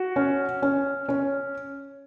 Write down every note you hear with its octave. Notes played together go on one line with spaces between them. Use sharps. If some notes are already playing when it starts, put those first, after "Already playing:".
Already playing: F#4
C#4
C#4
C#4